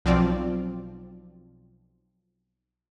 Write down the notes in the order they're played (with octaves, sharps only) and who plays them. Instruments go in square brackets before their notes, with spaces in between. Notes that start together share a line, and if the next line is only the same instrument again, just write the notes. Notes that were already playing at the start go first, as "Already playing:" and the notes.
[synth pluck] B1 F3 F#3 C4 F4 D5